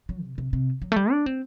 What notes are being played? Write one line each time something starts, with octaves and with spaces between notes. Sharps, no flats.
F#3
C3
C3
C3
F#3
A3
G3
D4
C4